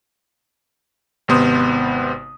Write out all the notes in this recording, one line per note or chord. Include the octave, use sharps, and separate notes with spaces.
G#1 C3 B3 C5 D#6